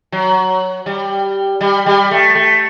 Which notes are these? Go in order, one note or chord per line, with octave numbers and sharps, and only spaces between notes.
F#3
G3
G3
G3
A3
A3